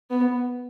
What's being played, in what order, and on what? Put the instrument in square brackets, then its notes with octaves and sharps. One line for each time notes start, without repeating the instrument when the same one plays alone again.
[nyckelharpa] B3